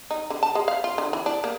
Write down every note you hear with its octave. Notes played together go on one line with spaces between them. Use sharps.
D#4
D3
A5
G#3
F5
F4
D3
E3
D4
A#3